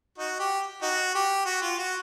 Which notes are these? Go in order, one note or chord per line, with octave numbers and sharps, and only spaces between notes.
D#4 F#4
G4
D#4 F#4
G4
F#4
F4
F#4